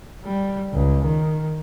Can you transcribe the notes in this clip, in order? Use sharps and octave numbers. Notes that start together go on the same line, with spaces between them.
G3
C#2
D#3